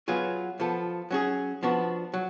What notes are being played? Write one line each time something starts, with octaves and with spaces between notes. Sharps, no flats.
F#3 B3 F4 G#4
F3 B3 F4 A4
F#3 C#4 G#4
F3 B3 D4 F#4
F#3